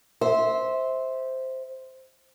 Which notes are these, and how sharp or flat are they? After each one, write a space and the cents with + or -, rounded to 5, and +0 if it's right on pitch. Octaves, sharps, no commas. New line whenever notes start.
C5 +0 E5 -20